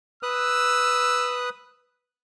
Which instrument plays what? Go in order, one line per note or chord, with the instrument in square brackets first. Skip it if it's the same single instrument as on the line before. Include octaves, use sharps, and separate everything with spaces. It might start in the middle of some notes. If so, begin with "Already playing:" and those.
[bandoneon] B4 D#6 F#6 [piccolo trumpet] E6